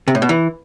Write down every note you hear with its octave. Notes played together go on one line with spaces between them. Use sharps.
C3
A2
B2
E3